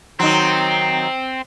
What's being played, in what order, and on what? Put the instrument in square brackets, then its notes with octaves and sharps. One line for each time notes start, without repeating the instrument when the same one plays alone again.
[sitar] D#3 F#3 [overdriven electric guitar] C4